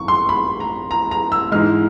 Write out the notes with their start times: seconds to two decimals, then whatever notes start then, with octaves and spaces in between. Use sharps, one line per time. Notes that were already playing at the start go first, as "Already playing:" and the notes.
Already playing: G#1 F#2 C#6
0.08 C6
0.29 B5
0.60 A#5
0.91 A#5
1.11 A#5
1.32 E6
1.52 G#2 E3 G#3 F6